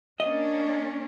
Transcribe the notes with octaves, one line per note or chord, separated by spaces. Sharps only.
A#3 C#4 D4 D#5